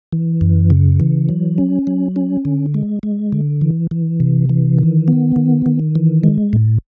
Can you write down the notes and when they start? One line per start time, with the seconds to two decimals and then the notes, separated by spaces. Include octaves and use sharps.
0.12 E3
0.41 F#2
0.70 C#3
1.00 E3
1.29 F#3
1.58 C#4
1.87 F#3
2.16 C#4
2.45 D3
2.74 G#3
3.03 G#3
3.32 D3
3.61 E3
3.91 E3
4.20 C3
4.49 E3
4.78 D#3
5.08 B3
5.36 D#3
5.66 D#3
5.95 E3
6.23 G#3
6.53 A2